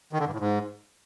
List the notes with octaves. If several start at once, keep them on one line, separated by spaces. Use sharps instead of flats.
D#3
D3
G2
A2
G#2